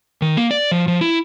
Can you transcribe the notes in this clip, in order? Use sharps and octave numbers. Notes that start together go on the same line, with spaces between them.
D#3
A#3
D5
F3
F3
E4